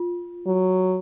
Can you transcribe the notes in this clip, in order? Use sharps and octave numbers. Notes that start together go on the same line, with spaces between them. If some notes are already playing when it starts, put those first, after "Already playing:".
Already playing: F4
F#3